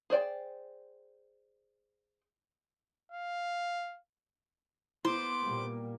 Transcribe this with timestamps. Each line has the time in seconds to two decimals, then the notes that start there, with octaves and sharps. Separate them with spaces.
0.10 G#4 C5 D5 G5
3.12 F5
5.05 B3 E4 C5 D6
5.41 A#2 G3 A#3